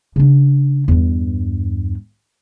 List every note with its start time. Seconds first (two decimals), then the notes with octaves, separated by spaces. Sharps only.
0.16 C#3 D4
0.88 E2 G2